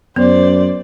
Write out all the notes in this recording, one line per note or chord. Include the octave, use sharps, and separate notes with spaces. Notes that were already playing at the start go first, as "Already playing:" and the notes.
F#2 B3 C5 D5